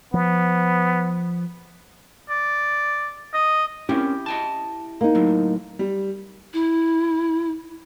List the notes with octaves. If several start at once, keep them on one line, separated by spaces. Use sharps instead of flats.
F3 B3
D5
D#5
C4 C#4 E4 G4 A#4
D#5 G5 A5
A#3 D#4
A2 F#3
G3
E4